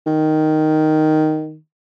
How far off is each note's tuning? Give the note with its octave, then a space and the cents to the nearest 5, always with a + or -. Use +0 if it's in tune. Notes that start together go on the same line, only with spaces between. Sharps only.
D#3 +0